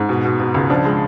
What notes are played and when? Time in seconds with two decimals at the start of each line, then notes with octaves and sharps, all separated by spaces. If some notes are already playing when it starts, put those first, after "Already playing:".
Already playing: G#2
0.09 B2
0.25 B2
0.39 B2
0.54 C#2
0.70 F3 D4
0.85 G#3